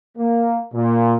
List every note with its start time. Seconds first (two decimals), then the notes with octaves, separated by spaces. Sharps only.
0.17 A#3
0.73 A#2